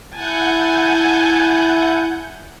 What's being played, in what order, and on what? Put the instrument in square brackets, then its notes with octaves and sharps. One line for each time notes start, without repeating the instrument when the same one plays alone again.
[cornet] E4 [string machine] F#5 G6 [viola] G#5 A5